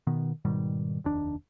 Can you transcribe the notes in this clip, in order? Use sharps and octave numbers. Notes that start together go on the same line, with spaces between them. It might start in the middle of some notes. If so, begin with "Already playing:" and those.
B2 D#3 B3
G#2 B2 D#3 G3
F1 D#2 D4